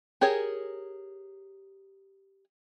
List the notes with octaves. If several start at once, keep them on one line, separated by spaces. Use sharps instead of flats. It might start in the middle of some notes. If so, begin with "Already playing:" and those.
G4 G#4 A#4 C#5